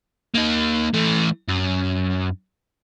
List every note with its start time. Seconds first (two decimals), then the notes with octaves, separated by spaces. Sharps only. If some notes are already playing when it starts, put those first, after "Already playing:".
0.34 A#3 D#4
0.94 E3 A3
1.49 F#2